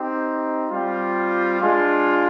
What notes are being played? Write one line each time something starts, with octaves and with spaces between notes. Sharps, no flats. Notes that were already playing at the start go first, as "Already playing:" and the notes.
Already playing: C4 D#4 G4
G3 C4 F4
G#3 D4 F4